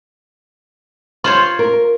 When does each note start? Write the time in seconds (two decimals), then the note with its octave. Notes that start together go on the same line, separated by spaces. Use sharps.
1.24 F4 C5 C#5 C6
1.59 A#4